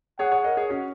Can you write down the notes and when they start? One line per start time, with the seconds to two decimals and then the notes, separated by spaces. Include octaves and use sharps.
0.19 G#4 C#5 F#5
0.31 G#4 C#5
0.44 A#4 D#5
0.57 G#4 C#5
0.70 C#4 F#4